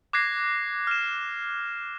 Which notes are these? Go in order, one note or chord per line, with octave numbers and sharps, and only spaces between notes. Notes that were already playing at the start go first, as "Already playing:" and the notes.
D6 F#6 G#6 A#6 C7
F6 E7